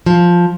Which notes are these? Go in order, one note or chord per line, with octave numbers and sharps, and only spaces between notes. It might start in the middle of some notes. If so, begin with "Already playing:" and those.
F3